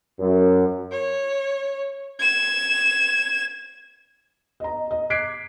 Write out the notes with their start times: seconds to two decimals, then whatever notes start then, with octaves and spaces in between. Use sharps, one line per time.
0.18 F#2
0.92 C#5
2.19 G#6 E7
4.60 D#5 A#5
4.91 D#5
5.10 D6 F#6 G#6 B6 C7 D7